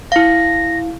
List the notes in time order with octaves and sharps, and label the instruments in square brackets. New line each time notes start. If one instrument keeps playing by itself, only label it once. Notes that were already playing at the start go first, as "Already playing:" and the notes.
[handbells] E4 F5 [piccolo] A#6